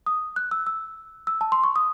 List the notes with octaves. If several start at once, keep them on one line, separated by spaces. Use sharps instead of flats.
D#6
F#6
E6
E6
E6
A5
C6
C#6
D#6